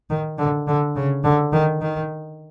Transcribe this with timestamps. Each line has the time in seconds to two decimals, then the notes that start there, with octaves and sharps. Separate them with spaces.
0.10 D#3
0.38 D3
0.67 D3
0.96 C#3
1.24 D3
1.53 D#3
1.81 D#3